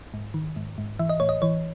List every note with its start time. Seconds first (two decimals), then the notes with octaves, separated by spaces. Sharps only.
0.14 G#2
0.34 D#3
0.56 G#2
0.78 G#2
0.99 E3 E5
1.09 D#5
1.20 A2 C#5
1.29 D#5
1.42 E3 C#5